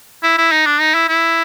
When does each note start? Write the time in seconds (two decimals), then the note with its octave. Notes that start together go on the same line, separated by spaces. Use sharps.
0.23 E4
0.38 E4
0.52 D#4
0.66 D4
0.80 D#4
0.95 E4
1.09 E4